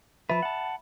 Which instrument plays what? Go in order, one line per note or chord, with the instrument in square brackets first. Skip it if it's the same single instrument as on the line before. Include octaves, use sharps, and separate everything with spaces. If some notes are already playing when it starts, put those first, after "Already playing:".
[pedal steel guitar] F3 B4 [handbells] E5 B5
[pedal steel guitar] F#5 A5